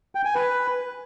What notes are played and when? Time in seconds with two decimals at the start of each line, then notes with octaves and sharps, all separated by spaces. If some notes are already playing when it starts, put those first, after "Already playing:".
0.15 G5
0.25 G#5
0.35 B4